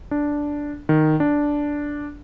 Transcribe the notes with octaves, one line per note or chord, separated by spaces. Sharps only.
D4
D#3
D4